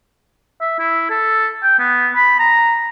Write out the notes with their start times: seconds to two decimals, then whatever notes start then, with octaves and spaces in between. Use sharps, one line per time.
0.61 E5
0.79 E4
1.10 A4
1.63 G5
1.79 B3
2.15 B5
2.39 A#5